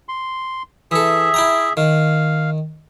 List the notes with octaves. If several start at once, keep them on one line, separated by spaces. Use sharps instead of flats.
C6
E3 G#4 A4 E5
E4 G5 A#5
D#3 F5